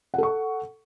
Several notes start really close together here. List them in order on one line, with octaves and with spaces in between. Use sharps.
F#5 A4 C#6